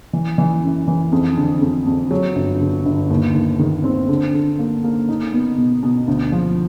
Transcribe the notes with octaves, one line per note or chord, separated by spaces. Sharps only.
E3
E3
F#2
E3
F2
D3
F2
F2
F#3
G1
D3
G1
D#2
D#2
D#3
C4
D3
D3
A#3
A#3
D#4
B3
B2
B2
D2
F3